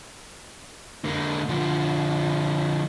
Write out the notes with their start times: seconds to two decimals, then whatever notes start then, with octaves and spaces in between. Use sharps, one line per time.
1.04 D3 A#3
1.49 D3 F3